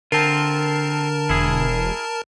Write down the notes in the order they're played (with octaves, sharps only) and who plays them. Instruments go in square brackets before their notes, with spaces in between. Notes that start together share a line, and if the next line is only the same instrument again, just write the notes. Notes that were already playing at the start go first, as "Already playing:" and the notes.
[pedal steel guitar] D3 [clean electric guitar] C4 F4 [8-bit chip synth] A#4 A5
[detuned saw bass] E1 [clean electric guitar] E4 G#4